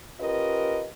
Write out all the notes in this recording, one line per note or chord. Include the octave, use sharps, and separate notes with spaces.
C#4 F4 G4 A#4 B4 D#5